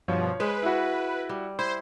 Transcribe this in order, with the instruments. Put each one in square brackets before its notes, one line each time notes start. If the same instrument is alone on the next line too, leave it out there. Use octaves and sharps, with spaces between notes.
[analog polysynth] G2 B2 F3 [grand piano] C#5
[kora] G#3 C5 [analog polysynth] B4
[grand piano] E4 F#4
[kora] G3
[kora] E4 [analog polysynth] C5